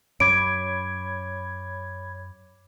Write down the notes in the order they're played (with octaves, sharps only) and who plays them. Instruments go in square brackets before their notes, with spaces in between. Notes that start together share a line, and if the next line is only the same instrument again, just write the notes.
[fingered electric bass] F#2 [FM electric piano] C#5 B5 G#6 [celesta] D6 D7